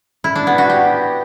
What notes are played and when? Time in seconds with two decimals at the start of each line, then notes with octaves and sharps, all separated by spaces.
0.24 E4
0.36 D4
0.47 B3
0.58 F#4
0.70 G4